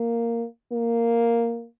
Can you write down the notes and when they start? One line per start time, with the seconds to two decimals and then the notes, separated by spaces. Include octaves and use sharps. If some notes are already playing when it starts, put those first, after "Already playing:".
Already playing: A#3
0.72 A#3